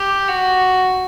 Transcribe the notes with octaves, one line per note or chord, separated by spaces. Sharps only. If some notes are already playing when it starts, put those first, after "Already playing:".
Already playing: G4
F#4